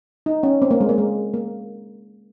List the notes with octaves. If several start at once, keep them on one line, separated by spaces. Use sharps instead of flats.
D#4
C#4
C4
A#3
G#3
A#3
G#3
A#3